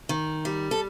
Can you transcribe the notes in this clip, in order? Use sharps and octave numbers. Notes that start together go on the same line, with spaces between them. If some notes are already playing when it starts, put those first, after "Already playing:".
D#3
G3
A4